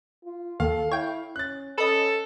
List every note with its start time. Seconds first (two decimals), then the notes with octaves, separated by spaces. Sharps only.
0.24 F4
0.60 D#2 A4 F5
0.91 E4 C#5 G5
1.36 C#4 F#6 A6
1.78 C#4 A4 B4 D#5